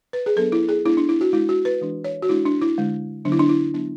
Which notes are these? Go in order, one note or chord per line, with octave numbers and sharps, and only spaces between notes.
B4
G#4
F#3 B3 D4 A4
E4
G#4
G#3 B3 D4 E4
D4
E4
F#4
G#3 D4 E4
F#4
B4
E3 G#3 D4
C#5
F#4
G#3 D4 E4
D4
E4
D3 G#3 D4
D3 F#3 B3 D4
E4
D4
E4
F#3 B3 D4